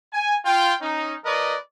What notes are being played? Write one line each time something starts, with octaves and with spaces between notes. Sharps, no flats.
G#5
F4 G5
C#4 D#4
F3 A#4 B4 D5 D#5